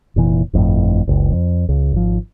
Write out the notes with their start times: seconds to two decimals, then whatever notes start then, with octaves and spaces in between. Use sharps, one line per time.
0.16 F1 A#2 E3
0.53 G1 F2 A2
1.08 F#1 C#2
1.32 F2
1.69 C#2
1.93 G#1 F3